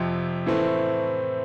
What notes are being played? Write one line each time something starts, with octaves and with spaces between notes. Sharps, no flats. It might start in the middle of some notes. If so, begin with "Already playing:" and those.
Already playing: F2 C3 F3
A2 E3 A3 C4